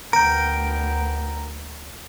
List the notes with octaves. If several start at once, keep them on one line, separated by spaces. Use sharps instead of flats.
D2 B3 A#4 G5 A#5